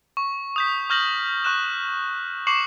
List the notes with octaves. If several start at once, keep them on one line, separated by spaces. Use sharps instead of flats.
C#6
D#6 G6 B6
C#6 F6 G6 A#6 F#7
C#6 F#6 E7
C#6 D6 C7 C#7 E7 F#7